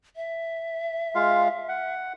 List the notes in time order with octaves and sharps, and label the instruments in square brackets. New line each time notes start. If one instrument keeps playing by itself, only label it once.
[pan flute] E5
[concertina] G#3 F4 F5
F#5